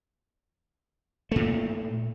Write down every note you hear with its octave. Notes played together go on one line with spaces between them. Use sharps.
A#2 A3